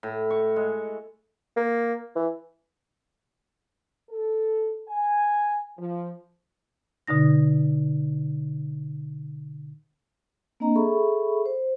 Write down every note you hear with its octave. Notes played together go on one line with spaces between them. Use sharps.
A2
C#6
G#3
A#3
E3
A4
G#5
F3
B2 D3 D#4 A#6
A#3 C4 D4 D#5 A#5
G#4 A4 E5 B5 C#6
C5